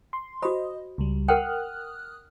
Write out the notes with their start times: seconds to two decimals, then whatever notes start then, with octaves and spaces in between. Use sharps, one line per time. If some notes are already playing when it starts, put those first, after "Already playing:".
0.13 C6
0.42 F#4 C5 D#5 B5
0.98 C#2 G3
1.28 A#4 F#5 G5 D#6 F6 F#6